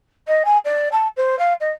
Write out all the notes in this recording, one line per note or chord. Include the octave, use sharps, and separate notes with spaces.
D#5
G#5
D5
A5
C5
F5
D#5